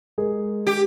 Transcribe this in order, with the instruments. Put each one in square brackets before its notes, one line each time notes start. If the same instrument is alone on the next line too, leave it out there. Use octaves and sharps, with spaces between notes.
[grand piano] G#3 G#4 A#4
[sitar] G4